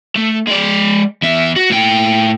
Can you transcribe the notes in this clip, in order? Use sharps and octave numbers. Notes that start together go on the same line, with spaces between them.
A3
G#3 D5
E2 E5
F#4
A2 G5